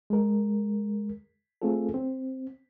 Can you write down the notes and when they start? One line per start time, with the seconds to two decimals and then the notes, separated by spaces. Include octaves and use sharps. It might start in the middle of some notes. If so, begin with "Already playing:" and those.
0.10 G#3 A#4
1.62 A3 C4 F4 G#4 A4
1.94 C4